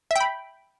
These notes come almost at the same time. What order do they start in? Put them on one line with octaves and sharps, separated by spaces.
E5 G5 B5